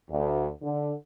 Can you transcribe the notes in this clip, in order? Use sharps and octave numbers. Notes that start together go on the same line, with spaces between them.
D2
D3